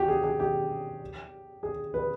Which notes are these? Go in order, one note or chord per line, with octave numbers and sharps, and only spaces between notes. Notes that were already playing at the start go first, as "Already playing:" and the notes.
Already playing: F#4 G4
G#4
G#4
G4
G#4
B4